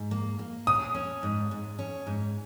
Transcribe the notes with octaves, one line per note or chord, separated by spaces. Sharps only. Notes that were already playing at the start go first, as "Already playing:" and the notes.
Already playing: G#2
A#3
A#3
C#4 D#6
C#4
G#2
G#2
C#4
G#2